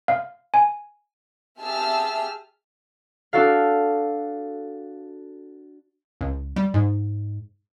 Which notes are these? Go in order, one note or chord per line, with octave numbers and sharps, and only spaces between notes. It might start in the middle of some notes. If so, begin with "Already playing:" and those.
F5
G#5
G4 G#4 E5 A5 E6 F6
D4 F#4 A4 F5
C#2
G3
G#2